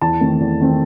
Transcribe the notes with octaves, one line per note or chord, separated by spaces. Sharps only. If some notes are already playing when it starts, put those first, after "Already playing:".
E2 A5
D#3 A3 C4
E2
D#3 A3 C4